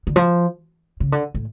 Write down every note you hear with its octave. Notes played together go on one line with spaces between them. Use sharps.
D3
F3
C#3
D3
A2